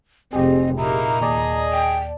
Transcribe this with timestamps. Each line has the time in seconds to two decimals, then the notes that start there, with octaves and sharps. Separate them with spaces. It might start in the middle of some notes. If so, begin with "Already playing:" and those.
0.33 F1 C4 G4 G#4 D#5
0.77 A#2 A#3 D#4 E4 A#5
1.22 D#2 G#4 D5 D#5 A5
1.73 G5